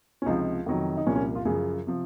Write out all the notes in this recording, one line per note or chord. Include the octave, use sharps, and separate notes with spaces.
C#4
C#2 C3 F3 D#4
F2 C3 D#3 F#3
D#4
C2 A#2 F3 C#4
C#4
F4
F#2 C#3 F3 G#4
C3 F3